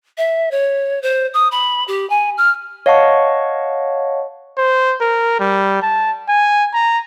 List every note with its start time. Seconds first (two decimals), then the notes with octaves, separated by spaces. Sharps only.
0.18 E5
0.51 C#5
1.03 C5
1.34 D#6
1.52 B5
1.88 G4
2.10 G#5
2.38 F6
2.86 C#5 D#5 F5 F#5 A5 C#6
4.58 C5
5.01 A#4
5.40 G3
5.82 A5
6.29 G#5
6.74 A#5